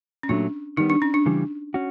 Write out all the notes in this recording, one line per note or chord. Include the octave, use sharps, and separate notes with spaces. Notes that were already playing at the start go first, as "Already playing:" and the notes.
C#4
A#2 F#3 A3 D4
D#3 G3 B3 D#4
D4
C#4
D4
C#3 E3 G3
C#4 F#4